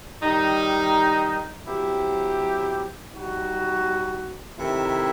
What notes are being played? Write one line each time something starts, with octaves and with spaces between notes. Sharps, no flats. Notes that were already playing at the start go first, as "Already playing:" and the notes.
D#3 G3 D#4
F#3 C4 E4 G4
G3 D#4 F#4
C3 D#3 A3 E4